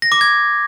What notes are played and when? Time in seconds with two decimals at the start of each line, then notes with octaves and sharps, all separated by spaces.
0.02 A#6
0.12 D6
0.21 G#6